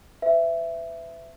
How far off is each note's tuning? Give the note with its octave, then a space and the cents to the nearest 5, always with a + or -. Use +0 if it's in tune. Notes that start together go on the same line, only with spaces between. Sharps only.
B4 +45 E5 +10